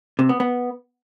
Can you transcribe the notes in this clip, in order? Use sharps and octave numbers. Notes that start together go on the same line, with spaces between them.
C3
B3
B3